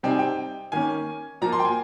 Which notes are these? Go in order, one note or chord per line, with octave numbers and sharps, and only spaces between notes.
C3 G3 C4 D#4 G5
G#5
G5
D#3 A#3 C#4 G#5
A#2 F3 A#3 A#5
C6
G5
G#5